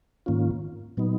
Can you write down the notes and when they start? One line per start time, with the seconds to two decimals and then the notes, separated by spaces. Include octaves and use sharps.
0.26 G#2 D#3 A#3 C#4 F4
0.97 A#2 F#3 B3 D#4